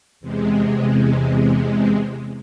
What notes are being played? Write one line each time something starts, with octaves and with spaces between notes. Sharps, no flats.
E2 C3 G#3